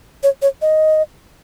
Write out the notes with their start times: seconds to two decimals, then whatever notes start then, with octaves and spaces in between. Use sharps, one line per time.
0.23 C#5
0.42 C#5
0.62 D#5